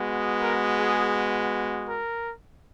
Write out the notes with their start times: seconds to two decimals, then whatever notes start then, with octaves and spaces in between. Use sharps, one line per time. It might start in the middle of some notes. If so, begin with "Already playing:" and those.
Already playing: G#3 B3 F#4
0.42 A#4
0.79 G#4
1.88 A#4